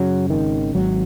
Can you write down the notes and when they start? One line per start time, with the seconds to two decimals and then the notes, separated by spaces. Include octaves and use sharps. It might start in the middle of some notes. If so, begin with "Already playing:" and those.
Already playing: F#2 C#3 F#3
0.30 G#1 D#3
0.75 G#1 F#3